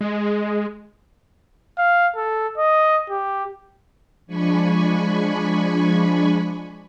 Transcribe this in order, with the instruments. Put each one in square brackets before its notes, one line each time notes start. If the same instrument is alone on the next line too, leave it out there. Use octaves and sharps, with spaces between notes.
[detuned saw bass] G#3
[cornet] F5
A4
D#5
G4
[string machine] F3 G#3 D4 G#5 B5 C#6